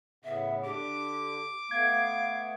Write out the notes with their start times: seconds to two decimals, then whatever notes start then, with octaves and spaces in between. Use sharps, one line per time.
0.24 A2 C#3 B3 E5
0.64 D3 D4 G4 D6
1.71 A3 B3 F5 G#6 D7